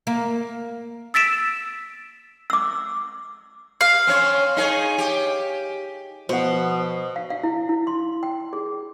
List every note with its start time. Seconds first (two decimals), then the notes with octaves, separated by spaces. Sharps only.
0.07 A#3
1.14 E6 A6 B6 D7 E7
2.50 D6 E6
3.81 F5
4.07 C4 C#4 C#5
4.57 D#4 G#4 C#5
4.98 G4
6.29 B2 F3 C5 F#5
7.16 F5
7.30 F5
7.43 E4
7.69 E4
7.87 C6
8.23 G5
8.53 G#4